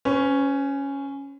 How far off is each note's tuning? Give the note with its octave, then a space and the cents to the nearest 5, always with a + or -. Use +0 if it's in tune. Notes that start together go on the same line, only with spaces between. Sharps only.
C#4 +0 B4 +45